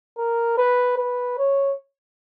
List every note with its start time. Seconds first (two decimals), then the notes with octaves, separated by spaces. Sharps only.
0.18 A#4
0.57 B4
0.98 B4
1.38 C#5